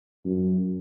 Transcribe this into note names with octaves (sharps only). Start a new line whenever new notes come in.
F#2